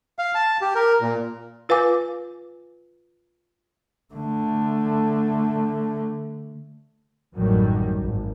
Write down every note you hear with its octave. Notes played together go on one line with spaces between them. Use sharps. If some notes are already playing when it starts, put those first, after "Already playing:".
F5
A5
G4
A#4
A#2
F4 B4 F5 G#5 D6
D3 A3
A1 F#2 A2 D#3 F#3 G3
G#1